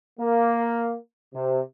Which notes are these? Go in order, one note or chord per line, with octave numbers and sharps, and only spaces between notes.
A#3
C3